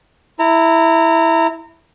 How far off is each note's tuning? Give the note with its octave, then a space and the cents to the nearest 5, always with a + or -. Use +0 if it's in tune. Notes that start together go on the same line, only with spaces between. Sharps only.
E4 +0 A#5 -25